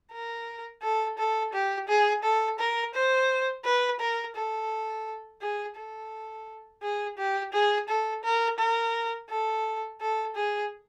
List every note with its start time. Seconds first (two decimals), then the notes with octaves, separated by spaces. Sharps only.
0.12 A#4
0.82 A4
1.18 A4
1.53 G4
1.88 G#4
2.24 A4
2.59 A#4
2.94 C5
3.65 B4
4.00 A#4
4.36 A4
5.41 G#4
5.76 A4
6.82 G#4
7.18 G4
7.53 G#4
7.89 A4
8.24 A#4
8.59 A#4
9.30 A4
10.01 A4
10.35 G#4